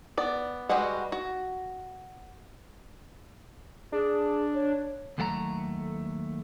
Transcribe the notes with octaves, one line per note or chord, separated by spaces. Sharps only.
B3 D5
G3 G#3 F#4 B4 F#5
F#4
D4 G#4
C#5
D#2 F#3 A3 F#5 A#5